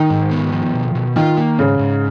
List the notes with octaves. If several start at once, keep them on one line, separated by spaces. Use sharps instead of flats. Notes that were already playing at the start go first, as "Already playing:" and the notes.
Already playing: D#3 D#4
G#2
B3
F3
B2
B2
D#3 F4
A#3
G#2 C#3
G#2